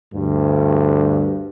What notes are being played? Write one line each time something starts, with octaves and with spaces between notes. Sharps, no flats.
D2 G2